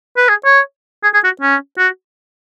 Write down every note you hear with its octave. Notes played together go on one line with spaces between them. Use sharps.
B4
G#4
C#5
G#4
G#4
F#4
C#4
F#4